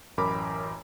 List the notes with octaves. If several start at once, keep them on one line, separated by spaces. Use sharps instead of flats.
A1 F#2 A#4 B5 D6